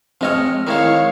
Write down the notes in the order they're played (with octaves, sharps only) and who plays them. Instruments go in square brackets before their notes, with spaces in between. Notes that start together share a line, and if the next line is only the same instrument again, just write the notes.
[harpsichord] F3 G#3 C#5 [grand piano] C4 D#5 F6
[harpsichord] D#3 G#3 [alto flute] E4 [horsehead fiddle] C#5 F5